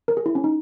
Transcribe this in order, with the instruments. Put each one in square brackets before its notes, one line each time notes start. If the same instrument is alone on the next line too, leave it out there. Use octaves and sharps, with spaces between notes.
[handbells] A#4
G#4
E4
C#4
D#4